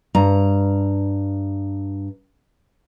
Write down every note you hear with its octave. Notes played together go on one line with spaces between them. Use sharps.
G2 A#5